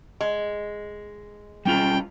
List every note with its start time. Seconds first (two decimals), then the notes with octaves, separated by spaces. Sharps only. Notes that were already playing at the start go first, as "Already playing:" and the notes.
0.21 G#3
1.65 G3 C#4 F4 G5